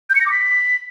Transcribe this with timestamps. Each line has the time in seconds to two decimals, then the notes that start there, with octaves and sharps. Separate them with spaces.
0.10 G6
0.15 C#7
0.21 A#6
0.26 D6
0.32 B6